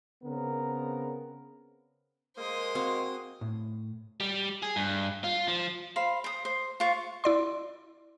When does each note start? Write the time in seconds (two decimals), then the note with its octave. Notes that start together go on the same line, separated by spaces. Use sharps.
0.23 C#3 B3 C4 A#4
2.37 G#3 A#3 C5 D#6
2.75 C4 F#4 F5
3.41 A2
4.20 G3
4.63 G#4
4.76 G2
5.24 F4
5.48 F3
5.96 C5 F5 B5
6.24 C5 D#6
6.45 C5
6.80 F4 C5 C#6
7.24 E4 D5 C6